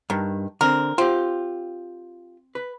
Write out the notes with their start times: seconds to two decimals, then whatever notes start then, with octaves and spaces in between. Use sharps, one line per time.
0.10 G2 D#3
0.61 D3 C4 A#4
0.98 C4 F4 G4
2.55 B4